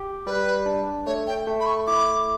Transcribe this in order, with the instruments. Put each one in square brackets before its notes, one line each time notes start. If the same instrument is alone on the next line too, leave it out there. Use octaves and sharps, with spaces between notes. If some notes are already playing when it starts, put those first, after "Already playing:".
Already playing: [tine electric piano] G4
[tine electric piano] G3 [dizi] B4
[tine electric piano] D4
[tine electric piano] A3 [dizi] C#5
[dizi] G5
[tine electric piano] A3
[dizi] B5
C#6
[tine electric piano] E4 [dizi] D6